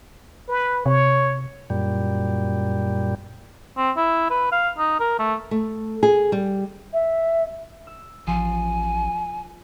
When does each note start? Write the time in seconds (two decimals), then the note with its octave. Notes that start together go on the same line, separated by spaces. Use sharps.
0.49 B4
0.86 C3 C#5
1.70 F#2 A#2 G3
3.77 C4
3.97 E4
4.30 B4
4.52 F5
4.78 D#4
5.00 A#4
5.19 A3
5.51 A3
6.03 G#4
6.32 G3
6.94 E5
7.87 E6
8.27 A1 F3 G#5 C6